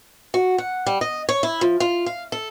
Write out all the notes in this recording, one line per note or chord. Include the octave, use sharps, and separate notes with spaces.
F#4
F#5
G3
D#5
C#5
E4
F3
F4
F5
A4